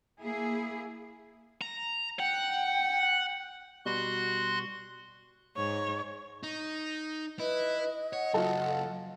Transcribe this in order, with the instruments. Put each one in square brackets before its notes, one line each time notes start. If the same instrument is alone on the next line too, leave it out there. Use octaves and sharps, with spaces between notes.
[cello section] A#3 E4 G#4
[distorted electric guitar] A#5
[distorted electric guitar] F#5 [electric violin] G5
[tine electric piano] B2 G3 [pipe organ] F#4 C6 F#6
[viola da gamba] G#2 [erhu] C#5
[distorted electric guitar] D#4
[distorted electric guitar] E4 [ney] B4 [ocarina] D#5
[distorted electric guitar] C#5 [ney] F#5
[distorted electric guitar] C#3 F#3 [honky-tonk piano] F4 F#4 A4